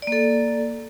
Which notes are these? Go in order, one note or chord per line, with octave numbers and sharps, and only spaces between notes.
A#3 A4 D5